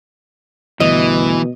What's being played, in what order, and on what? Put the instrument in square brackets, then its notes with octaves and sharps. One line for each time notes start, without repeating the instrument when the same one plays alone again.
[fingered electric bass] D2 G2 [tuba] B2 [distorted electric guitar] E3 [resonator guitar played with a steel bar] D#5